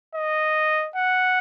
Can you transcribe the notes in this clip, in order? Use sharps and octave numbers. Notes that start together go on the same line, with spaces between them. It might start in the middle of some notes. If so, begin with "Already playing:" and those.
D#5
F#5